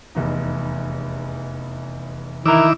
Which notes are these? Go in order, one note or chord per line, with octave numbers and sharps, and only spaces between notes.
F1 E2 D#4
D#3 E3 E4 A#4 D6 E6